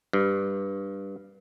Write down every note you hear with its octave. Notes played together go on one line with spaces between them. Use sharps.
G2